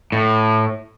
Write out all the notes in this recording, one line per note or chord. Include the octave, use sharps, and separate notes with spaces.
A2